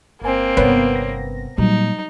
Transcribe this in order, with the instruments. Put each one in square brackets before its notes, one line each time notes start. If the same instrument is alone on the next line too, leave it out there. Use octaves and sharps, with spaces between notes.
[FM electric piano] G1 G#5 [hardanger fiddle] A#3 C4
[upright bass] G1 C3 [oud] B3 [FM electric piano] C#5 F5
[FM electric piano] A#6
[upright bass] A#2 [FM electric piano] F#3 G3 [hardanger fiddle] D#4